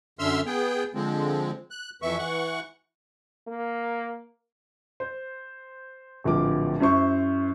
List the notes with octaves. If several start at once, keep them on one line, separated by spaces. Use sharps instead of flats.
F#2 D3 E5 C6 E6 F6
B3 G#4 G5
D3 F3 G#3 C4
F#6
F2 E3 E5 C#6
E3 F#5 C#6
A#3
C5
D1 A#1 F3 D6
F#2 E4 C5 C#6